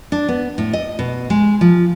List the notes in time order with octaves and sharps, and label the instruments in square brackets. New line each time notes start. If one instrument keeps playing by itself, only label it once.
[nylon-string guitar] D4
B3
A2
D#5
B2
G#3
F3